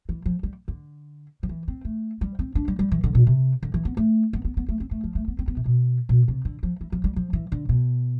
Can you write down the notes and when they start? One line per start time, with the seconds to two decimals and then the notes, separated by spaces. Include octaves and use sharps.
0.09 E3
0.26 F3
0.43 G3
0.68 D3
1.43 F3
1.49 E3
1.68 C4
1.85 A3
2.21 G3
2.39 C4
2.55 D4
2.68 G3
2.79 G3
2.92 E3
3.04 D3
3.15 B2
3.27 C3
3.63 D3
3.74 E3
3.85 B3
3.97 A3
4.33 B3
4.45 B3
4.57 B3
4.69 A3
4.80 C4
4.91 A3
5.04 F3
5.15 A3
5.28 B3
5.39 C4
5.48 B3
5.57 C3
5.65 B2
6.09 B2
6.28 C3
6.45 D3
6.63 F3
6.81 E3
6.92 F3
7.04 G3
7.16 F3
7.33 E3
7.52 D3
7.69 B2